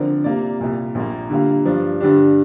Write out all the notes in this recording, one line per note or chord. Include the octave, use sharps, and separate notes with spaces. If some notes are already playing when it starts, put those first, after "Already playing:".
Already playing: D3 F3 C4 A#4 D5
C3 A#3 F4 D5
C2 A#2 A#3
A#1 A#2 A#3
D3 G3 A#3 F4
G2 F3 D4
G2 D3 G3 D4